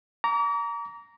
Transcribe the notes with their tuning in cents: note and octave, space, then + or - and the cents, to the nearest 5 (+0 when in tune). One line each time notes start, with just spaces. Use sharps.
A#5 +0 D6 -40